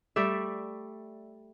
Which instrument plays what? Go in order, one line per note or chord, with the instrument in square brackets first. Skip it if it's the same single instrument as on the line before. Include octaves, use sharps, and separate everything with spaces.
[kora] G3 A3 D5 E5